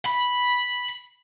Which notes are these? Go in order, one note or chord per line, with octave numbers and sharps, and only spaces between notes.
B5